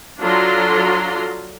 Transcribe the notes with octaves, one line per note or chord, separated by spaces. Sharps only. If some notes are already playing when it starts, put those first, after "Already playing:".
F#3 D4 F4 A4 A#5 C6